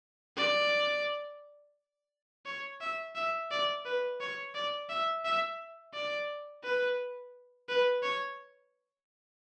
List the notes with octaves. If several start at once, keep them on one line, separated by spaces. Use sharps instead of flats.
D5
C#5
E5
E5
D5
B4
C#5
D5
E5
E5
D5
B4
B4
C#5